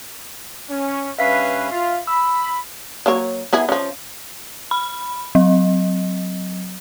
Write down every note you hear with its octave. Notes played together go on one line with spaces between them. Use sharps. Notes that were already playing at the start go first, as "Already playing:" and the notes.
C#4
G2 C#4 B4 E5 F5 B6
F4
B5 E6
F#3 A#3 C#5
B3 E4 G#4
F3 C#4
B5
F#3